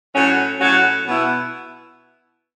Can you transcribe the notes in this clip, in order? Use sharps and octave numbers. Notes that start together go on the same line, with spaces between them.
A2 F#3 C#4 F#4
A2 F#3 C#4 F#4
B2 B3 E4